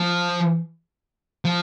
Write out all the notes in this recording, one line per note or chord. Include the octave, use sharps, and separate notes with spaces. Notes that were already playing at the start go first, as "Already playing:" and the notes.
Already playing: F3
F3